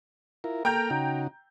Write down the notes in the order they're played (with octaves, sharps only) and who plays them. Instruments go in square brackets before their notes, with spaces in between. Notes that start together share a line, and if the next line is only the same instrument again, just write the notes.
[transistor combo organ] E4 F4 A#4
[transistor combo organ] A#3 A4 F6 [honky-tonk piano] G5 A#5 G6
[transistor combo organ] C#3 D#4 F#4